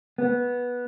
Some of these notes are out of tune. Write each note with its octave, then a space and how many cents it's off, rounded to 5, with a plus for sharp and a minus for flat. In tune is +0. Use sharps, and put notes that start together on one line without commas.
B3 -10